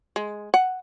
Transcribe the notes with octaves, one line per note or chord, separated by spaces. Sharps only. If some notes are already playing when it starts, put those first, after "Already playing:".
G#3
F#5